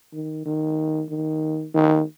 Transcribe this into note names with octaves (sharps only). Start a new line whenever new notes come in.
D#3
D#3
D#3
D#3